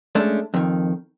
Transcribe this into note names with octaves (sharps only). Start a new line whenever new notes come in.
G#3 A3 C#4 D4
F2 D#3